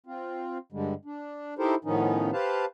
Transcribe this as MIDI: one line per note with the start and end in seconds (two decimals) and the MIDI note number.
0.06 0.58 60
0.06 0.58 65
0.72 0.94 43
0.72 0.94 50
0.72 0.94 55
0.72 0.94 56
1.05 1.54 62
1.59 1.75 63
1.59 1.75 64
1.59 1.75 67
1.59 1.75 69
1.59 1.75 70
1.59 1.75 72
1.85 2.31 45
1.85 2.31 51
1.85 2.31 53
1.85 2.31 59
1.85 2.31 61
1.85 2.31 63
2.33 2.65 67
2.33 2.65 71
2.33 2.65 72
2.33 2.65 77
2.33 2.65 81